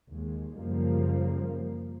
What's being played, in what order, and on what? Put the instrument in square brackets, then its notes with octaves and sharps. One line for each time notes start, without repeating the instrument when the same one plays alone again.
[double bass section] D#2 G#3
F#2 C#3 F3 G3 A#3